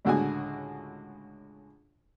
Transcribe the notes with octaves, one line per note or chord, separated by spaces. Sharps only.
C#2 A2 D3 F#4 G#4 G#5